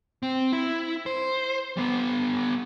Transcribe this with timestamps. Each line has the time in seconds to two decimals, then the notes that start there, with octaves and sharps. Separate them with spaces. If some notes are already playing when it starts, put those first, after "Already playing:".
0.23 C4
0.53 E4
1.06 C5
1.77 G3 B3